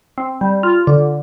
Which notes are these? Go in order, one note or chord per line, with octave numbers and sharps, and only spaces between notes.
C4
G3
F4
D3